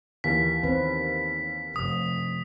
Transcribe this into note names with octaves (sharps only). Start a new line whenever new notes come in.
D#2 E3 B6
D#3 C4 B4
F1 D#6